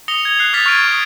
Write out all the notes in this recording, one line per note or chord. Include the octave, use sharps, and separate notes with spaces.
D#6 A#6 C#7 F7 G7
G#6 F7
F#6 C7 F7
D6 D#6 F6 A6 B6 F7
C#6 F6 G#6 D7 D#7
C#6 D#6